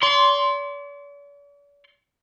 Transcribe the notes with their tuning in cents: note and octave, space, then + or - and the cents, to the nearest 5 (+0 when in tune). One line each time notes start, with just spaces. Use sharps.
D5 -45 C6 +0